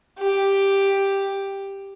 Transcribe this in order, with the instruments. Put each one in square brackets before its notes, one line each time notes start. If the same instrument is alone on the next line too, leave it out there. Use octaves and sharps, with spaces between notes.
[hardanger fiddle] G4